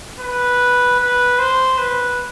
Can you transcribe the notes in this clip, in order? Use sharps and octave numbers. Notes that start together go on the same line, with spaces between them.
B4
B4
C5
B4